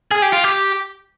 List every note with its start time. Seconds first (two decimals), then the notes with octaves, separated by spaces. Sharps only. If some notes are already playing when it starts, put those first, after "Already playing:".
0.11 G#4
0.22 G4
0.33 F4
0.44 G4